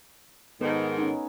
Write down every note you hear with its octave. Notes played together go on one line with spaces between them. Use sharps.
G#2 D#3 B3 A4 B4
C#4 D#4